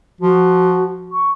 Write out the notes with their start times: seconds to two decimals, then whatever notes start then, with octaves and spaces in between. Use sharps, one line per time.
0.21 F3 F#4
1.12 C#6